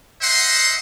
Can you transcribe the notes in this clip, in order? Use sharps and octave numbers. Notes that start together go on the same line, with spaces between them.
C5 D#5 E5 F#5 C6